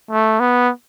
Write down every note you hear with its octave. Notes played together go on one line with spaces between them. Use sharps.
A3
B3